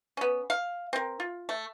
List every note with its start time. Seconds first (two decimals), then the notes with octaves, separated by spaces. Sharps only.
0.17 B3 C#4
0.50 F5
0.93 C4 A#4
1.20 F4
1.49 A3